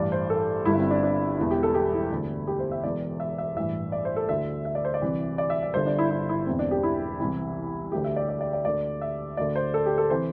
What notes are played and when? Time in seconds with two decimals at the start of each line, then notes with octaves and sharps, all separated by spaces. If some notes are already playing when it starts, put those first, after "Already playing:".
Already playing: A1 G2 E3 D5
0.12 C5
0.30 A4
0.65 G1 G2 D3 E4
0.78 C4
0.91 D4
1.03 D4
1.38 E1 E2 E3 E4
1.51 G4
1.63 A4
1.74 G4
1.93 E4
2.11 D2 D3
2.47 G4
2.59 C5
2.72 E5
2.84 E1 E2 E3 D5
3.20 E5
3.38 E5
3.56 A1 G2 E3 E5
3.92 D5
4.05 C5
4.16 A4
4.29 D2 D3 E5
4.65 E5
4.75 D5
4.85 C5
4.94 D5
5.01 C2 C3 E3
5.38 D5
5.50 E5
5.63 D5
5.74 G1 G2 D3 C5
5.86 D4
5.99 E4
6.11 E4
6.29 E4
6.47 E1 E2 E3 C4
6.59 D4
6.71 G4
6.83 E4
7.20 C2 C3 E3 E4
7.92 D2 D3 G4
8.04 E5
8.16 D5
8.29 D5
8.41 D5
8.53 D5
8.65 D2 D3 D5
9.01 E5
9.37 D2 D3 D5
9.56 C5
9.74 A4
9.86 G4
9.98 A4
10.10 C3 E3 C5